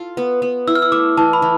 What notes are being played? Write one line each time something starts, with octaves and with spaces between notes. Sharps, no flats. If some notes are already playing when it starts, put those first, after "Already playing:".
Already playing: F4 A4
B3
B3
E4 E6
F6
E6
A3 D6
E3 A5
B5
E3